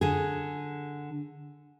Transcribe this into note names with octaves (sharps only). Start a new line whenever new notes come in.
D3 G#4